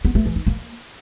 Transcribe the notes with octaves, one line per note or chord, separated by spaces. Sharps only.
B3
A3
E3
D#4
A#3